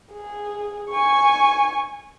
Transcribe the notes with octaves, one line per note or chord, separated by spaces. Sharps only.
G#4
G#5 C#6